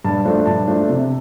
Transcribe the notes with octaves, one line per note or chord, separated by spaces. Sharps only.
G2 A5
F3 A3 D4
G2 A5
F3 A3 D4
C3